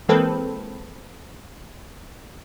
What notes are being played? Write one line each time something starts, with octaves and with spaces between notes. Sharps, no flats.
E3 G#3 A#3 C4 A4 B4